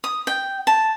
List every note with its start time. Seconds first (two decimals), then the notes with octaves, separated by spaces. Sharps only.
0.04 D#6
0.27 G5
0.67 A5